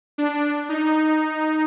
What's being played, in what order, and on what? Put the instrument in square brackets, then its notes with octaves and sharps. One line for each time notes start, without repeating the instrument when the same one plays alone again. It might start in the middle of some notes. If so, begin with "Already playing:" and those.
[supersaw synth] D4
D#4